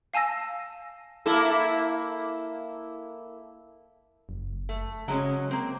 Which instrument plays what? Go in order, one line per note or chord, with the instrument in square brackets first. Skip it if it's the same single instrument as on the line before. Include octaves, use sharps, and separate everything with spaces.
[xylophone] F5 G#5 A5 E6 A#6
[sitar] A#3 E4 A4
[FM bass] F#1
[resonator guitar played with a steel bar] A3
[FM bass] C#3 [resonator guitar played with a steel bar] F#3 G#3 C#4
[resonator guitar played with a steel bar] A#3 C4